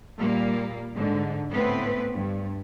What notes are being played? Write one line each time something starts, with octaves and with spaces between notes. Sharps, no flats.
A#2 G3 A#3
G#2 D3
A2 B3 C4 B4
G2